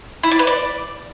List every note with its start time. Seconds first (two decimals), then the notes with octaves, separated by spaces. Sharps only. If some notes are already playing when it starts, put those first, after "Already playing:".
0.23 E4
0.31 D5
0.39 B4
0.47 D5